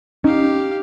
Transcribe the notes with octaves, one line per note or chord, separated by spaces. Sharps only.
C#4 D#4 G4 F5